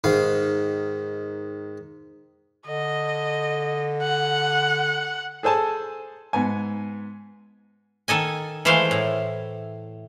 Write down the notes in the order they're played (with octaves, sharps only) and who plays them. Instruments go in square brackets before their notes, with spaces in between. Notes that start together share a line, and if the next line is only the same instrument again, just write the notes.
[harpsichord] G#2 D#3 F5
[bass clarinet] D3 [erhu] D#5
[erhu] F#5
[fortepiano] G#4 A4 C5 G#5 A5
G#2 B3 G#5
[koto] D#3 A4 D#5 G#5
E3 G#3 A3 C5 F5
A2